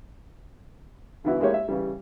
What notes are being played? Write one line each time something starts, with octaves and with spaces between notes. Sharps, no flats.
G2 D3 E3 B3 E4 F#4
G#3 A#3 E4 G4 C#5
E5
C#3 E3 G3